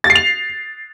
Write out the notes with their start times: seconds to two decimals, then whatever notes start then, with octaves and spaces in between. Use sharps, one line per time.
0.04 A6
0.10 C7
0.15 F7